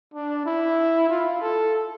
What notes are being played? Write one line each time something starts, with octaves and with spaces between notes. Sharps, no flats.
D4
E4
F4
A4